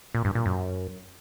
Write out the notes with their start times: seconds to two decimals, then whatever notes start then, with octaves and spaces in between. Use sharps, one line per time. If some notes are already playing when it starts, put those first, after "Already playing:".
0.15 A#2
0.25 G2
0.35 A#2
0.46 F#2